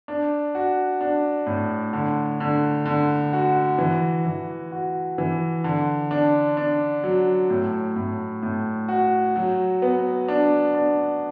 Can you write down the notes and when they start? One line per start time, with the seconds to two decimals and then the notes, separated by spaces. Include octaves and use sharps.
0.08 D4
0.55 F#4
1.01 D4
1.47 A2
1.93 D3
2.40 D3
2.85 D3
3.33 F#4
3.78 E3
4.26 E3
4.72 F#4
5.18 E3
5.64 D3
6.11 D4
6.57 D4
7.04 F#3
7.50 A2
7.96 A2
8.43 A2
8.88 F#4
9.36 F#3
9.82 B3
10.28 D4
10.75 D4